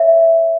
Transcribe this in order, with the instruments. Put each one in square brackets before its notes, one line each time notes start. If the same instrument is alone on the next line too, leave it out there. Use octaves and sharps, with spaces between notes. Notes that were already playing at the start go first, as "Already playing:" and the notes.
Already playing: [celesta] C#5 E5